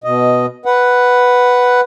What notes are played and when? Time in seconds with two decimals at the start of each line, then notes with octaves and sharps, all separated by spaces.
0.04 B2 D#5
0.65 B4 F#5